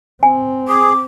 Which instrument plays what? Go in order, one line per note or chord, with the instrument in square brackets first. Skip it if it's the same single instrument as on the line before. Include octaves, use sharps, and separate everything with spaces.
[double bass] C4 [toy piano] G#5
[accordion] G#4 [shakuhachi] D6